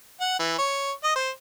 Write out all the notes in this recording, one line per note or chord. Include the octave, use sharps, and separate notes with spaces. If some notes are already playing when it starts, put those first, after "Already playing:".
F#5
E3
C#5
D#5
C5